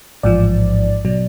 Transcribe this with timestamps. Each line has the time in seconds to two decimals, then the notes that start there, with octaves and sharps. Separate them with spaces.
0.23 A1 G#2 F3 D5
1.05 B2 F#3